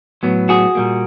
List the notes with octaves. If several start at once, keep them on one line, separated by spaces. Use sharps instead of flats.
A2 F#3 B3
F#4 G#4
A#2 G3 A#3